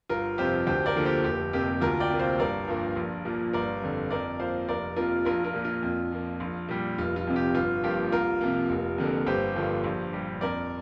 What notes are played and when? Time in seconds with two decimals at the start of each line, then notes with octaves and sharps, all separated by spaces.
0.09 G1 F4 A#4
0.38 F2 C3 F3 G4 C5
0.67 D2 G4 C5
0.86 A#4 D5
0.96 D3 F3 A#3
1.05 G4 C5
1.24 F1 G4
1.53 F2 C3 A#3 G4
1.81 D2 F4 A#4
2.00 D5 G5
2.10 C3 A#3
2.19 C5 F5
2.39 G1 A#4 D5
2.67 G2 F3 A#3
2.96 A#1
3.25 A#2 F3 A#3
3.53 G1 A#4 D5
3.82 F2 D3
4.10 F2 A#4 D5
4.40 F3 A#3 C5 F5
4.68 F1 A#4 D5
4.96 F2 F3 A#3 F4 A#4
5.25 A#1 F4 A#4
5.44 F4 A#4
5.54 A#2 A#3
5.65 F4
5.82 F2
6.12 F3 A#3
6.40 A#1
6.68 A#2 G3
6.98 F1 F4
7.16 F4
7.27 F2 C3
7.36 G4
7.55 G1 F4
7.83 G2 F3 A#3 G4
8.12 C2 F4 A#4
8.41 C3 F3 A#3
8.69 F1
8.98 F2 D3 A#3
9.26 G1 G4 C5
9.56 G2 D3 F3 A#3
9.84 A#1
10.13 A#2 G3
10.41 F2 A#4 D5